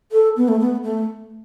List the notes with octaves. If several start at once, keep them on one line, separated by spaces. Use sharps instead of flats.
A4
B3
A3
B3
A3